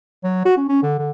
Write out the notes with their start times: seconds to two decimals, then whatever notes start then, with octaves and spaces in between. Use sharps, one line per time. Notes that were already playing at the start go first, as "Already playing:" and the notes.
0.24 F#3
0.45 F#4
0.57 C#4
0.69 C#4
0.83 D3
0.99 D3